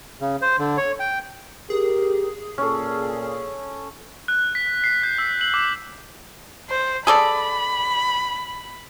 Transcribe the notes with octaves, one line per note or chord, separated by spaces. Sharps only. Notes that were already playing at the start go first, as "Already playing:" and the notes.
C#3
C5
D3
C#5
G5
G4 G#4 A#4
A#2 C#4 A4
F#6
B6
C7
G6
E6
F#7
D6
C5
G#4 A4 D5 B5